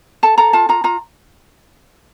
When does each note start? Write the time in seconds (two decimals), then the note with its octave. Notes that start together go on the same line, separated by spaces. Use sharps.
0.23 A4 A5
0.38 A4 A#5
0.53 F4 A5
0.69 F4 A#5
0.84 F4 A#5